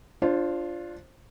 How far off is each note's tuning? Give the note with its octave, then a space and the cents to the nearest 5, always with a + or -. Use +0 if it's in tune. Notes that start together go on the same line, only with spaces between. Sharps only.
D4 +0 F4 -10 C5 +25